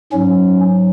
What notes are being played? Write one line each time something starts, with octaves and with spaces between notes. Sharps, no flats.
G#2 F#3 C#4